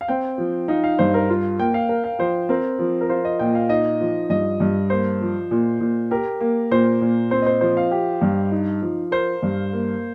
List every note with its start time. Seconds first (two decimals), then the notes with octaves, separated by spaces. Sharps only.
0.01 F5
0.08 C4 G5
0.38 F3
0.68 D#4 F5
0.84 F5
0.99 G2 C5
1.14 A#4
1.29 F4
1.59 A#3 G5
1.74 F5
1.89 A#4
2.04 F5
2.19 F3 C5
2.49 C4 A#4
2.79 F3
3.01 A#4
3.09 F4 C5
3.25 D#5
3.39 A#2 G5
3.55 F5
3.69 D#4 D#5
4.01 F3
4.30 G2 D#5
4.60 G2
4.90 A#3 C5
5.21 F3
5.51 A#2
5.80 A#2
6.11 G4 A#4
6.40 A#3
6.71 A#2 C5
7.01 A#2
7.31 C4 C5
7.42 D#5
7.46 C5
7.61 F3 C5
7.77 F5
7.91 G4
8.21 G2
8.52 D#4
8.82 F3
9.11 A#4 C5
9.42 G2
9.73 A#3